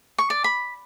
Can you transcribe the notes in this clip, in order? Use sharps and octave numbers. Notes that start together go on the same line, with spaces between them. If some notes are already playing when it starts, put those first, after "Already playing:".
C#6
D5
B5